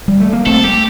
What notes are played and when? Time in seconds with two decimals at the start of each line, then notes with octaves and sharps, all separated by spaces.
0.08 G3
0.20 A3
0.33 A#3
0.46 A3 C4 A4
0.64 G4